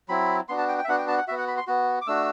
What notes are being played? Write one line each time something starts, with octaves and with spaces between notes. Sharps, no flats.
F#3 C4 E4 B5
B3 D4 F#4 C6
A5
G5
G5
E5
B3 D4 F#4 F#5
G5
A5
F#5
B3 F#4 E5
F#5
B5
C6
B3 F#4
D6
A3 D4 F#4 E6